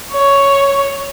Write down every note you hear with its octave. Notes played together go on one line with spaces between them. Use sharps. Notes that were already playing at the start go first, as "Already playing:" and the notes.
C#5